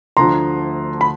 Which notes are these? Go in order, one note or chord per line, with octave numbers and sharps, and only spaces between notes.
D2 D3 F3 A#5 C6
B5